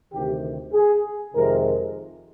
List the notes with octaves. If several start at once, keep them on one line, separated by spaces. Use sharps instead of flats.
D2 C3 D#3 G4
G#4
F2 C3 D#3 G#3 A#4